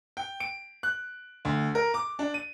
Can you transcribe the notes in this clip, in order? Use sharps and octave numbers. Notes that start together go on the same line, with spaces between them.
G5
D7
F#6
D2
A#4
D6
D4
D#7